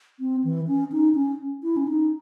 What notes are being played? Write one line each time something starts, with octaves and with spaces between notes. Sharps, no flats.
C4
E3
C#4
D#4
C#4
E4
C#4
D#4